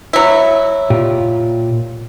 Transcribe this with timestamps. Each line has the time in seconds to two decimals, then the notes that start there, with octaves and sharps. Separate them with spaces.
0.13 F#3 E4
0.90 A#2 F4 G4